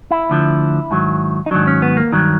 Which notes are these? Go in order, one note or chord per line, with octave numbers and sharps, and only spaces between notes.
E4
D2 D3 F3
G#2 D#3 F#3
D#4
G#2 D#3 F#3 D4
C#4
B3
A#3
G2 D#3 F#3